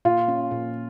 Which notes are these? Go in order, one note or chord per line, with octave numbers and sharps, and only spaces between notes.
A#2 F4
C#4
A#2